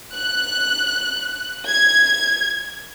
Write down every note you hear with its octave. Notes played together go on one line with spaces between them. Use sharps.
F#6
G#6